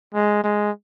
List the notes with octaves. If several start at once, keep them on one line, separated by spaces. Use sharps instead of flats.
G#3
G#3